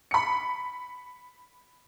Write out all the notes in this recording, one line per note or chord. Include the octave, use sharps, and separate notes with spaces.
B5 C#7